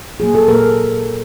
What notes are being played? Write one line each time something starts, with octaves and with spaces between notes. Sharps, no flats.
A#2 F#3 A#3 G#4
A4
A#2 F#3 A#3 A#4